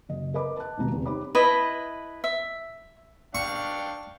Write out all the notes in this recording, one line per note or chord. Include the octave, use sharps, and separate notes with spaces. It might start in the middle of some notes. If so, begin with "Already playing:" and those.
F#1 D#5
A#4 B4 D#5 B5 D6
A5 F#6
D#1 C#2 B2 A#5
E2 C3
D#4 G4 C5 C#5 B5 D6
E4 B4 D#5 A5
E5
D4 F5 G5 C#6